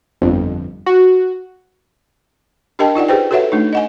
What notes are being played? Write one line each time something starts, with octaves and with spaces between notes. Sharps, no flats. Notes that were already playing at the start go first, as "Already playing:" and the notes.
G1 F2
F#4
D4 G4 A#4 D#5 G5 A5
D#4 F4 D5 F#5
G4 G#4 B4 C5 G5
F#4 A4 B4 C#5 E5 F#5
A3 D4 D#4
D#5 F#5 G#5